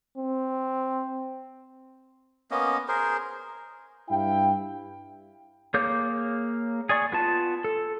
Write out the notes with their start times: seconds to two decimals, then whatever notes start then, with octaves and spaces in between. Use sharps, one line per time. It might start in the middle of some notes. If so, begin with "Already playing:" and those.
0.18 C4
2.51 A#3 B3 C#4 D#5
2.88 G#4 A#4 C5
4.09 G2 E4 F5 G5
5.74 A#3 G#4 C#5 D6 G6
6.89 G#4 D5 C#6
7.12 B3 F4 A5
7.64 A4